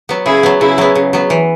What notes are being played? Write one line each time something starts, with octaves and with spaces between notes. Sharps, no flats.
F#3 B3
C#3 E4 G#4
F#3 B3
C#3 E4 G#4
F#3 B3
C#3
F#3 B3
E3